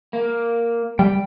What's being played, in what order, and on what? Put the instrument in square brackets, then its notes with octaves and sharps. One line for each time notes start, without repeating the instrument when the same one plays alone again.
[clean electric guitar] A#3
[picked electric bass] G3 [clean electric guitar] G5